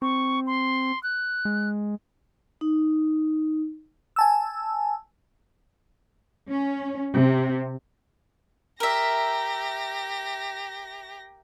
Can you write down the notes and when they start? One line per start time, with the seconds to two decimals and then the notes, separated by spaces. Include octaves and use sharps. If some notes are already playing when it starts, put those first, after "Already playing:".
0.02 C4 C#6
0.47 C6
1.03 F#6
1.45 G#3
2.61 D#4
4.16 G#5 A5 E6
6.49 C#4
7.14 C3
8.80 G4 A#4 E5 A#6